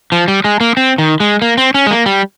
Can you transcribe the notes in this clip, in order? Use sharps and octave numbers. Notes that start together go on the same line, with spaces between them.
F3
G3
G#3
A#3
C4
D#3
G#3
A#3
C4
C#4
G#3
A#3
G3